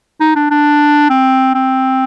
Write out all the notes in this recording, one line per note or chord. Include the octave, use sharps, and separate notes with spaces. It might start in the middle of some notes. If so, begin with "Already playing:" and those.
D#4
D4
D4
C4
C4